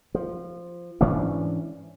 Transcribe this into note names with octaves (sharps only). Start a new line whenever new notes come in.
F3
G#2 E3 C#4 D4